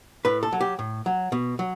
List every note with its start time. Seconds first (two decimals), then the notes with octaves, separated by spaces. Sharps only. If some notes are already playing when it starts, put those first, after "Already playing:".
0.25 A2 B4
0.43 A4
0.53 F#3
0.61 G4
0.79 A2
1.06 F#3
1.32 B2
1.59 F#3